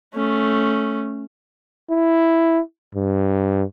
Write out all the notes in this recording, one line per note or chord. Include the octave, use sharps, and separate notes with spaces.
A3 C#4
E4
G2